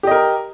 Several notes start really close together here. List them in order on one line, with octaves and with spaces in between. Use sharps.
G4 D#5 A#4